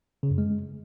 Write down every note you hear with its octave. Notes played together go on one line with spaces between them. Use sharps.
C#3
F#2
G#3